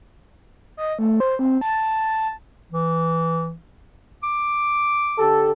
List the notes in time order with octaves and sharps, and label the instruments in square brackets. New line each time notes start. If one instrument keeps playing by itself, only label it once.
[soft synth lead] D#5
A3
C5
C4
A5
[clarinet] E3
D6
[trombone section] D3 G4 A4